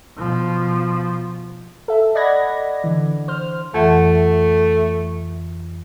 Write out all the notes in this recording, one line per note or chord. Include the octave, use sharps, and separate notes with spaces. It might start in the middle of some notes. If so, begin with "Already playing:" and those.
B2 F3
A4 E5
D5 D#5 F#5 B5 G#6 A#6
D3 E3
C5 F6
F2 E3 A3 F#5